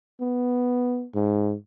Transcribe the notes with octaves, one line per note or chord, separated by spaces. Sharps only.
B3
G#2